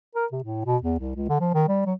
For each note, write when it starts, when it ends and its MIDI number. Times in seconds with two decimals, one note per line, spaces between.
0.15 0.26 70
0.32 0.41 48
0.44 0.62 45
0.66 0.77 47
0.82 0.99 40
0.99 1.14 36
1.16 1.29 37
1.29 1.38 50
1.40 1.51 53
1.54 1.64 51
1.68 1.84 55
1.86 1.94 54